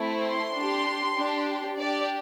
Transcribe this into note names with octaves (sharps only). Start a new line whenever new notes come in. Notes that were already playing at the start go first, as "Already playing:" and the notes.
Already playing: A3 C4 E4
C6
D4 G4
D4 G4
D4 G4 D5